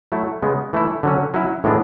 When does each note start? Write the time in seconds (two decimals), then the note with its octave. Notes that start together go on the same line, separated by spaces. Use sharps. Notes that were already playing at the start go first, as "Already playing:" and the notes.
0.12 F#3 A3 E4
0.42 C#3 G#3 B3
0.73 E3 A3 E4
1.03 D3 F#3 C#4
1.34 F#3 C#4 E4
1.64 A2 E3 G#3 B3 D4